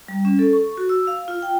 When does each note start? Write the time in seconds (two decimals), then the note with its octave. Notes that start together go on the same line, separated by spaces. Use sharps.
0.08 G3
0.25 C#4
0.39 A4
0.53 C#6
0.77 F#4
0.89 E6
1.07 F5
1.28 F4
1.42 G5